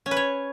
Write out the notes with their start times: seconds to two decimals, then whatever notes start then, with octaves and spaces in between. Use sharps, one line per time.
0.06 C#4
0.11 B4
0.17 C#5